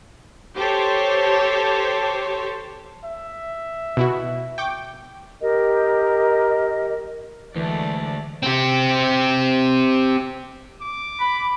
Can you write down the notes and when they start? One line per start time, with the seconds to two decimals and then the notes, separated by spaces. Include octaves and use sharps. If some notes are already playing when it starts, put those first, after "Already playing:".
0.57 G4 A4 C5 C#5
3.05 E5
3.97 B2 E4 F#4
4.58 G5 C#6 D6
5.41 G4 A#4 D#5
7.56 D2 E3 G#3 A3 D5
8.43 C4 G4
10.81 D6
11.20 B5